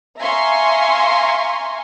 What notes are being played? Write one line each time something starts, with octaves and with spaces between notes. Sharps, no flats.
E5 F5 G#5 A#5 C6 C#6